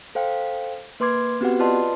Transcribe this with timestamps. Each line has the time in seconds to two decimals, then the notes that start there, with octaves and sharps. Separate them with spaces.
0.15 A4 C5 F5 G5
1.00 A#3 B4 C6 D6 G#6
1.41 B3 C4 F#4 G4 B4 F#5
1.59 F4 B4 D5 D#5 A5 C6